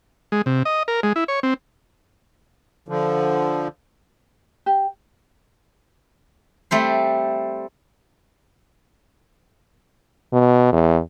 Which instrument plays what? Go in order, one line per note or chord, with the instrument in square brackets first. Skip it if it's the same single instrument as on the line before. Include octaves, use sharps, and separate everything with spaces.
[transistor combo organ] G#3
C3
D#5
A#4
G#3
E4
C#5
C4
[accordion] D3 F3
[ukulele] G4
[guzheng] G3 A3 C4 C5
[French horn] B2
E2